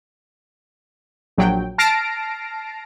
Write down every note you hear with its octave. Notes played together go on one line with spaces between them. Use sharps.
A#1 F#3 G5
A5 F6 A#6 C7 D7